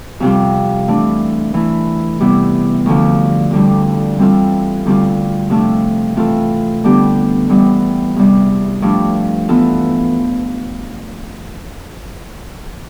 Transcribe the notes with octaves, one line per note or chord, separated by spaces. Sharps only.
F2 C3 G3 C4 F4
E3 A3 D4
E3 A3 E4
C3 G3 B3 E4 G4
D2 D3 F3
F2 D3 G3
E3 G3 C4 F4 A4
D2 D3 G3 C4 F4
C3 F3 A3 D4 A4
E3 A3 C4 F4 A4
D3 G3 B3 D4 G4
G2 E3 G3 B3
E2 C3 G3
G2 F3 A3 D4
E3 B3 F4 A4